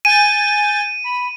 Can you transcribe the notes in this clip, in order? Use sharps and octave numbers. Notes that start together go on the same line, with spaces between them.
G#5 G6 A6 D#7
B5